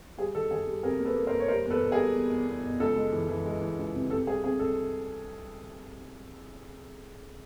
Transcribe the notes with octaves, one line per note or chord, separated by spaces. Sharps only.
G3 G#4
D#3 A4
D#3 G#4
G3
C3 G#4 A#4
A#3
A4 B4
A#3
A#4 C5
A#3
C#5
G3 A#4 C5
E2
A4 B4
B2
G#4 A#4
G3
E2
E2
E2
B2
C#2 A4
G#3
E3
E3
G#3
E3
C#2
C3
C3 A4
C2 G#4
C3 G#4
C2 A4